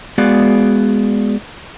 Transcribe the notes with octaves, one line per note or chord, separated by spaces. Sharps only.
G#3 B3 F#4 G#4 D5 F5